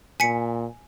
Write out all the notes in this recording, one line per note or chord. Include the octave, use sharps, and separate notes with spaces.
A#2 G#5 B6 C#7